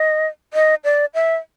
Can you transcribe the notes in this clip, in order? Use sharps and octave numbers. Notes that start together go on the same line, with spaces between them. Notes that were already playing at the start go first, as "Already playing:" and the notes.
Already playing: D#5
D#5
D5
E5